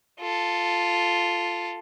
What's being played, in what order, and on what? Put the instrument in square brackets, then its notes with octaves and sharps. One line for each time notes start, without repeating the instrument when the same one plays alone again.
[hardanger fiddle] F4 A4